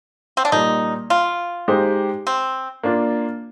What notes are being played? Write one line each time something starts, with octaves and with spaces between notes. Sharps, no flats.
C4
D4
A#2 G3 A#3 D#4
F4
G#3 D#4 G4 C5
C4
A#3 D4 F4